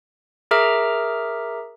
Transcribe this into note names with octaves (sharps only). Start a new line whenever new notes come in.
G#4 A#4 E5 A#5 D6 F6